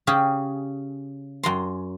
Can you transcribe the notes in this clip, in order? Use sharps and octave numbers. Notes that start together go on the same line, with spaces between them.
C#3 C#4 G4 G#4
F#2 A#5 C6